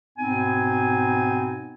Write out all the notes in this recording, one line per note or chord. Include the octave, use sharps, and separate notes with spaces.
G#2 B2 B3 C4 D#4 G#5